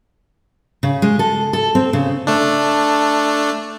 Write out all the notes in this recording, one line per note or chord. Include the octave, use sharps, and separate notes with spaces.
C#3
G#3
A4
A4
C4
C#3
A3 D4